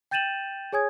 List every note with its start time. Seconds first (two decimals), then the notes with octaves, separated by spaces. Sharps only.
0.11 G5 G6 A6 D#7 E7 F#7
0.72 G#4 C#5 G#5 D#6 G#6